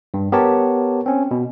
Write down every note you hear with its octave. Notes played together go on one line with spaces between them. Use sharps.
G2
B3 G4 A#4 C#5 A5
C4 C#4
B2